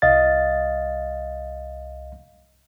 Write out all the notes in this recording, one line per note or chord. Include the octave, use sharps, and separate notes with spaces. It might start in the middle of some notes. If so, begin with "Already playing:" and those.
C2 D#5 F5 A6